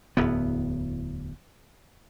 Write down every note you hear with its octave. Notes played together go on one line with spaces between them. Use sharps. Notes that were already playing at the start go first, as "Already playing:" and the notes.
D1 E2 B3